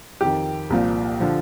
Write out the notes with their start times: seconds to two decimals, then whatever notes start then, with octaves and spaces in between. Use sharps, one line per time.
0.21 F2 D#3 G4
0.70 C2 A#2 F3
1.20 D3 F3